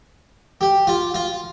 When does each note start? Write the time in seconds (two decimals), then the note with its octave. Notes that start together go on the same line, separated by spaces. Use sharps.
0.61 G4
0.87 F4
1.14 F4